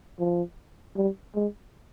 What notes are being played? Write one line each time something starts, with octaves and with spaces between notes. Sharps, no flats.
F3
G3
G#3